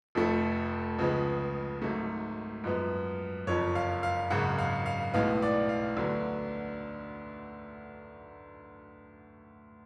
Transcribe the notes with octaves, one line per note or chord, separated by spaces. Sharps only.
F1 F2 F3 A3
C#2 C#3 F3 G#3 B3
G#1 G#2 F#3 A3
F#2 F3 G#3 B3
F#1 F2 F3 C#5
F5
F5
G#1 F#2 C#3 F#5
F5
F5
B1 A2 G#3 B3 F5
D5
F5
D2 D3 F#3 B3